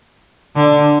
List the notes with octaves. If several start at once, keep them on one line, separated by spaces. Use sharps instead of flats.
D3